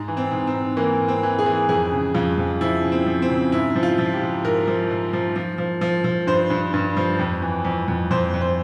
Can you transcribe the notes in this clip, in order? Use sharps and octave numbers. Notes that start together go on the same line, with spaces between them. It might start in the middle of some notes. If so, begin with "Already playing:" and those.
Already playing: G#2
E3
C4
G#2
C4
G#2
E3 A#3
G#2
C4
E3
G#4
E3
F2 G#4
C#3
F2 F4
F2
F3 E4
C#3
C4
F3
C4
C#3
G#2 E4
F3
F4
F3
G4
G#2
G#2 A#4
F3
G#2
F3
F3
F3
F3
F3
G2 C5
G2
G2
F3
F2
E3
F2
F2
F2 C5
F2
C5